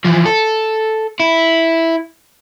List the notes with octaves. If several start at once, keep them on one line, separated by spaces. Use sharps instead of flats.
E3 F3
A4
E4